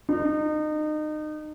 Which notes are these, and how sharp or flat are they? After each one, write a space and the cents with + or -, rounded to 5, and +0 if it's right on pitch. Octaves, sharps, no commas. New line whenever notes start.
D#4 -30